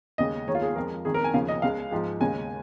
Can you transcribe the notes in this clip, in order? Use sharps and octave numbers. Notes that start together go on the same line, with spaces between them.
D#2 C#3 G#3 D#5
D#2 D#3 G#3 C#5
F4
G#4
F2 F3 G#3 A#4
F2 D#3 G#3 G#4
A#4
G#5
D#2 C#3 F3 F5
D#5
C#2 C#3 G#3 F5
G#2 F3 G#3
D#2 C#3 G#3 G#5